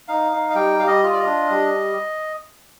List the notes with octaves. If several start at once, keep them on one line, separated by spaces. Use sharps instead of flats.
D#4 F5
D#4
F5
G3 G5
G3 F5
D#5
F4
D5
D#5
D4
G3